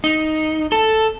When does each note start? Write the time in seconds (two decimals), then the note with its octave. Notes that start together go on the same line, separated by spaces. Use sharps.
0.04 D#4
0.72 A4